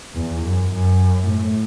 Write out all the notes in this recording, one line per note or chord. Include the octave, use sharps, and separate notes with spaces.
E2
F#2
F#2
A2